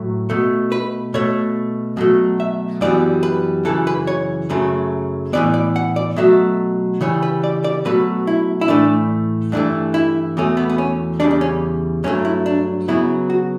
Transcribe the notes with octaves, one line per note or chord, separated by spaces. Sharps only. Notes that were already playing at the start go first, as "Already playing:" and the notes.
Already playing: A2 F#3 A3
B2 A3
B4
B2 A3 C#5
B2 F#3 A3
E5
F#2 E3 G3 B3 D5
B4
F#2 C#3 E3 A4
B4
C#5
F#2 C#3 F#3 A3
A2 E3 B3 D5
D5
F#5
D5
B2 F#3 A3 E5
C#3 E3 G3 C#5
B4
D5
D5
B2 F#3 A3 B4
E4
E4
A2 E3 A3 D4
G2 E3 A3 D4
E4
E2 B2 A3 C#4
B3
B3
C#4
E2 C#3 G3 D4
D4
C#4
G2 F#3 A3 C#4
E4
D4
C#3 F#3 B3 E4
F#4